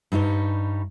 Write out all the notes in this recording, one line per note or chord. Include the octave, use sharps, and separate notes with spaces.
G2 G3 D#4 C#5